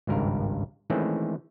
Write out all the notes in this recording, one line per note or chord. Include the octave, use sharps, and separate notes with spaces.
G#1 C#2 G2 A#4
D#3 E3 G#3 A3 C4 C#4